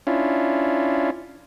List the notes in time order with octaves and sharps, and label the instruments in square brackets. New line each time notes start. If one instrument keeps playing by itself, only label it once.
[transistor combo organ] C#4 D4 E4 F4